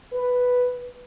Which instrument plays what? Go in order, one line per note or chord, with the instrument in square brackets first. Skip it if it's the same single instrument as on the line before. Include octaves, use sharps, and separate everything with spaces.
[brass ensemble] B4